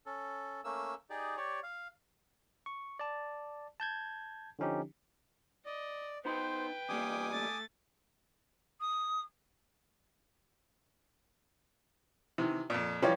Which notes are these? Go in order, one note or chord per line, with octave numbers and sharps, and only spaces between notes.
C#4 A4
A3 A#3 C#4 E6
D#4 G4 G#4 D5
G4 C#5 D5
F5
C#6
D5 A5
A5 G6 G#6
D3 F3 C#4 D#4 G4
D5 D#5
B3 D#4 B4 C5 G5 B5
E2 G3 A#3 G#5 D6 D#6
A3 A6
D#6
C3 D#3 E3
F2 A#2
E3 F3 G3 G4 C#5 F5